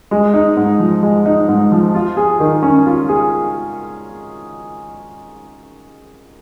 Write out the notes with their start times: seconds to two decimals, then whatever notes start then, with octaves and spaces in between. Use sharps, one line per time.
0.11 G#3
0.34 D#4
0.57 G#2
0.79 F3
1.03 G#3
1.26 D#4
1.48 G#2
1.72 F3
1.94 F4
2.17 G#4
2.40 D#3
2.63 C#4
2.86 F4
3.09 G#4